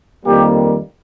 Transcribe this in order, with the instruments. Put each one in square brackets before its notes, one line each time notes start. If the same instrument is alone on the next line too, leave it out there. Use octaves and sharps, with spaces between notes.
[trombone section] F2 D#3 G3 A#3 G4